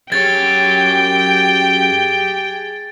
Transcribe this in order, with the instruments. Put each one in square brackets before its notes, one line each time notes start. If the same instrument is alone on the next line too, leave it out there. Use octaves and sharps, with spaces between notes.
[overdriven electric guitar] F#2 C#5 [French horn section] G4 G#4 [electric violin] G5 [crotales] G#6 A6